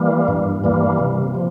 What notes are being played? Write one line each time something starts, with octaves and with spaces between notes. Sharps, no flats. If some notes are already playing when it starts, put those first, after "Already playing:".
Already playing: E3 G3 A#3
G2
E3 G3 A#3
C3
F3